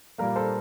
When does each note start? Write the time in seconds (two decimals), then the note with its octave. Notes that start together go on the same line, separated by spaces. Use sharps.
0.18 A#2 G3 A#3 A#4
0.36 A4 C5